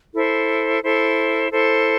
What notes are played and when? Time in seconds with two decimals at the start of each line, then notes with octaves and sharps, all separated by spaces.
0.13 E4 A4 C5
0.82 E4 A4 C5
1.50 E4 A4 C5